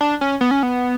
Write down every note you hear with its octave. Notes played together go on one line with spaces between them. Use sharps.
D4
C#4
B3
C#4
B3